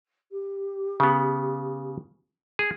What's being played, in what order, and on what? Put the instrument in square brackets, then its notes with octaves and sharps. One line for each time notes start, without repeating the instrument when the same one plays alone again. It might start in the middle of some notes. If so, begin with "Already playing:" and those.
[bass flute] G4
[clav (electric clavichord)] C#3 B3
G#4